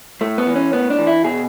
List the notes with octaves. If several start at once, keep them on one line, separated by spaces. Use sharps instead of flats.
A2 A3
B3
E3
C#4
A2 B3
D4
E3
E4
B2 G#4